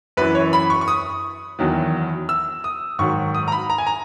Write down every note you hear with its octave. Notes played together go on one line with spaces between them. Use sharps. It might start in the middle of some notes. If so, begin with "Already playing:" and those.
F#2 E3 B4
C#5
B5
C#6
C#6
D#6
E2 D#3 F#3
E6
D#6
G#2 D#3 F#3 C#6
D#6
A#5
B5
A#5
G#5
A#5